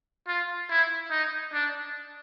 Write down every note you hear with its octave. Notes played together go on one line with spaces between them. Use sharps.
F4
E4
D#4
D4